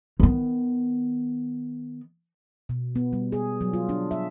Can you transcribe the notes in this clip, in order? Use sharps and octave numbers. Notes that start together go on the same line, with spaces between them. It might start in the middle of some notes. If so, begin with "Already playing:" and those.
D#3 B3
B2
B3
G3
G#4
F#3
F4
D4
E5